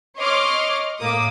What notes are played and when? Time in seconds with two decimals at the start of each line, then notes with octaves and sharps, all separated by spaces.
0.17 C#5 D#5 C6 D6 F6
0.99 A2 A#3 D6 D#6